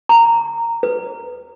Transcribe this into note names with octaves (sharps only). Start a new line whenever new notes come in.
A#5
B4